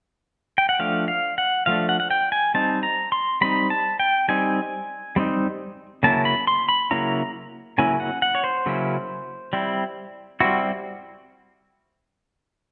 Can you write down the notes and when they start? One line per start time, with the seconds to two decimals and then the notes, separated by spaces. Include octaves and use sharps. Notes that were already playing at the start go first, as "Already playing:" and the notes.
0.58 G5
0.69 F#5
0.79 F3 A3 D4 F5
1.08 F5
1.38 F#5
1.66 F3 A3 D4 F5
1.89 F#5
2.00 F#5
2.11 G5
2.32 G#5
2.54 G3 C4 D#4 A5
2.83 A#5
3.12 C6
3.41 G3 C4 D#4 B5
3.70 A5
4.00 G5
4.28 G3 C4 D#4 G#5
5.16 G3 C4 D#4
6.03 C#3 F#3 A#3 C#4 E4 A5
6.25 B5
6.47 C6
6.69 B5
6.91 C#3 F#3 A#3 C#4 E4 A#5
7.78 C#3 F#3 A#3 C#4 E4 G#5
8.00 F#5
8.22 F#5
8.35 C#5
8.44 C5
8.66 C#3 F#3 A#3 C#4 E4
9.53 G3 C4 E4
10.40 G3 C4 E4 F#4